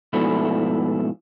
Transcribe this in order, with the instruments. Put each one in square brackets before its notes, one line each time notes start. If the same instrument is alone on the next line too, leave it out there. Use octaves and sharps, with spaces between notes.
[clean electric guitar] G#2 B2 F3 A3 D4 E4